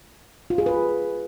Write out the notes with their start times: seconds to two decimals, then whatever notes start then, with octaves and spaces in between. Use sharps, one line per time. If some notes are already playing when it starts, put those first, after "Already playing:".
0.50 F4
0.58 G#4
0.66 B4